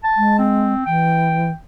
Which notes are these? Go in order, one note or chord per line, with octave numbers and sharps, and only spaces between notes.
A5
G#3
C4
E3 G5